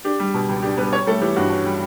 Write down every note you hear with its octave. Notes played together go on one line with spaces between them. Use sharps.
D4 G4
G3
B2
C#2
D4 G4
G3 B3 B4
C#4 C#5
G3 A3 A4
E3 G4
G2 F#4
C#4
G3